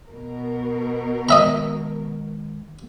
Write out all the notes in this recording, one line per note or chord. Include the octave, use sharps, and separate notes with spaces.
B2 A#4
D#3 G#3 D#5 E5 A#5